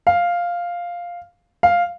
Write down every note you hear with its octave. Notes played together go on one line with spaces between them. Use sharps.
F5
F5